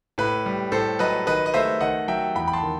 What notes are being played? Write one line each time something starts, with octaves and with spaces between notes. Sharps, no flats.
A2 B4
G3
A2 A4 C5
F#3 B4 D#5
D#3 B4 D#5
D#5
A3 C5 E5
D#3 D#5 F#5
F#3 E5 G5
E2 G5 B5
B5
A5 C6
D#3